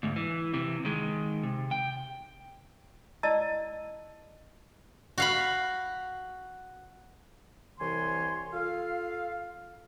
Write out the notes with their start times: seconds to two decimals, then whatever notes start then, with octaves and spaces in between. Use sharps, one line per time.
0.03 D2 G#2
0.16 E3
0.54 C3 E3
0.85 D#3 G#3
1.43 C3
1.71 G5
3.23 E4 D5 D#5 A5 E6
5.18 F#4 F5 B5
7.80 C2 E3 C#5 G#5 C6
8.54 F4 A4 F5